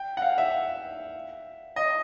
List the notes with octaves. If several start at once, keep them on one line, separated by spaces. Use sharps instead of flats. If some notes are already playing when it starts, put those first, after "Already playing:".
Already playing: G5
F#5
F5
E5
D#5